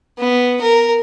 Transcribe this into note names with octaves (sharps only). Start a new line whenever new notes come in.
B3
A#4